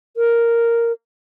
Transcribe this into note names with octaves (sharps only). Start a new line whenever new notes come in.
A#4